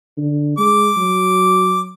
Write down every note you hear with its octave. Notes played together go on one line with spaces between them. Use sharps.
D3
G#3 D6
F#3